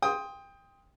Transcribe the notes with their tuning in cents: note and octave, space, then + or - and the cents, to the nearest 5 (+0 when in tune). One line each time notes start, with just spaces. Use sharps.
G5 +20 C6 +0 D#6 +15